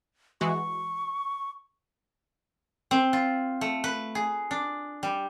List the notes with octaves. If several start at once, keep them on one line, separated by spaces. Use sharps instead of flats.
E3 G#3 F#4 C#6
C4
F4
A3
B4
G#4
D4
G3